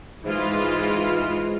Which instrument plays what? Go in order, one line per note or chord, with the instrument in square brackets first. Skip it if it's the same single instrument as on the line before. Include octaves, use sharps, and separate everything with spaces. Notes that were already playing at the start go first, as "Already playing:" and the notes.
[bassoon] G#2 [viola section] E3 G#3 F4